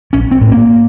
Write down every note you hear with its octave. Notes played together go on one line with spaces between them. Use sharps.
A#1 C#4
C4
A2
A#3